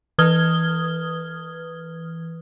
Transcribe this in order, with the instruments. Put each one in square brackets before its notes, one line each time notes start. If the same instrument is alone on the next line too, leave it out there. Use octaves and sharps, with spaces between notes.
[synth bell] E3 B4 D#6 F6 G#6 G7